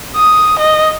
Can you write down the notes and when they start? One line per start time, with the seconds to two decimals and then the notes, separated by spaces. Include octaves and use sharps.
0.16 D#6
0.59 D#5